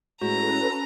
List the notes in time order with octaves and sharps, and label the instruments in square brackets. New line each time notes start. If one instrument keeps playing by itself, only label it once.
[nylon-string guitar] A2 G#3 [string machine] C#4 A4 B4 [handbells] F#4 [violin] A#5